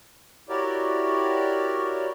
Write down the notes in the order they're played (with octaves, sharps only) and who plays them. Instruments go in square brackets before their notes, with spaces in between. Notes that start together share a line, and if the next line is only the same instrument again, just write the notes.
[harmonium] E4 F#4 G4 A#4 C#5 D5